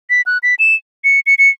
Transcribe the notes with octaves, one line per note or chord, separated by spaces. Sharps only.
B6
F#6
B6
E7
C#7
C#7
C#7